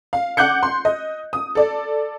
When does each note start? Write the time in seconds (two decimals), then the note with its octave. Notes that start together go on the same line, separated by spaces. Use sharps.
0.13 F5
0.37 F#5 D6 F#6 G6 C#7
0.63 C6
0.85 D#5
1.33 D#6
1.55 A4 D5